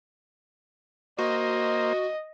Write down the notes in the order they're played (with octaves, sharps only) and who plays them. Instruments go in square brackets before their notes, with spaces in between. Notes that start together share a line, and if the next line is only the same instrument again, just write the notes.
[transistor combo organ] A#3 C5 [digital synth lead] F#4 [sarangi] D#5